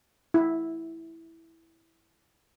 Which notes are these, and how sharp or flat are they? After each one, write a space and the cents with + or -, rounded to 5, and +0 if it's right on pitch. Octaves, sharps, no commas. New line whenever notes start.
E4 -5